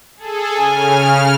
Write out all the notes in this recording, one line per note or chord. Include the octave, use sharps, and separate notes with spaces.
G#4 A4
C#3 G#5 F6